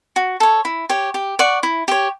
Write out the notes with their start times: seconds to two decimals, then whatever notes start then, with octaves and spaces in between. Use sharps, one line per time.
0.16 F#4
0.40 A4 C#5
0.65 E4
0.89 G4 C#5
1.14 G4
1.39 D5 F#5 C#6
1.63 E4
1.88 G4 C#5